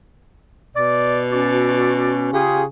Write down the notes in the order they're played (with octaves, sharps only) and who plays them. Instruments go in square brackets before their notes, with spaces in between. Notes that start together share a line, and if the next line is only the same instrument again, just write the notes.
[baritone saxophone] B2 [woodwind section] D5
[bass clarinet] C#4 [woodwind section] F#4 D5
[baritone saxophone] C#3 [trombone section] F4 G4 G#4